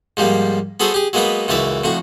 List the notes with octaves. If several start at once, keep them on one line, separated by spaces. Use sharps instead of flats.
G#2 F3 G3 A#3
B3 F#4 G#4 A4 C5 C#5
G4 G#4
F#3 G#3 A#3 B3 D#4 B4
C#2 F#2 E3 C#5 D5 E5
F2 A2 F#4 C#6